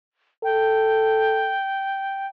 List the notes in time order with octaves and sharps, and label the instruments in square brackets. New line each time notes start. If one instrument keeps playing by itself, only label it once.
[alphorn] A4 [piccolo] G5